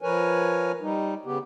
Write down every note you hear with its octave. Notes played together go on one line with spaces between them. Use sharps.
F3 A#4 B4 C#5 G#5
G3 D#4
C#3 B3 G4